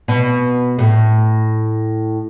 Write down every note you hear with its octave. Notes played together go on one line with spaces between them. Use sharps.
B2
A2